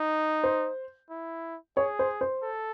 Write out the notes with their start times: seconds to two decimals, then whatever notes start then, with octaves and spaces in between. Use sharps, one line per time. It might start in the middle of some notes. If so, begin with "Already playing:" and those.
Already playing: D#4
0.44 C5
1.10 E4
1.77 G#4 C#5
1.99 C5
2.21 C5
2.43 A4